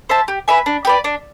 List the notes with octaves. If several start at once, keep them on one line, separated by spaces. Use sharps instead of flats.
C5 E5 A5
G4
B4 E5 G#5
D4
G4 B4 D5
D4